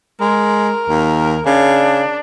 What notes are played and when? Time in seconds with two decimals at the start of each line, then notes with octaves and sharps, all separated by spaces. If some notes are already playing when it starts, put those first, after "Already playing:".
0.21 G#3 A#4
0.89 D#2
1.46 C#3 D4